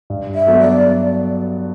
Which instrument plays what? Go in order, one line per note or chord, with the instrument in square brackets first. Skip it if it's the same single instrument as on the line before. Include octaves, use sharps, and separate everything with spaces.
[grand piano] G2
[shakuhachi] E5
[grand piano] F#3 B3 F#4 A4
[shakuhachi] D5